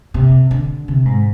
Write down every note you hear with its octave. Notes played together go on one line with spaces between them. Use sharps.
C3
D3
C3
G#2